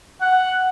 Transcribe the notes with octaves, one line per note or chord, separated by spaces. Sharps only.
F#5